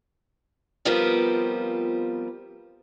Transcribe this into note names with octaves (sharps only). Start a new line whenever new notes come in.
F3 G3 B3 C4 F4 A#4